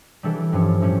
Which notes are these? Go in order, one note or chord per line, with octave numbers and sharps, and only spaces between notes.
E3 G3 D4 A4
G2 F3 C#4
A2 G3 C#4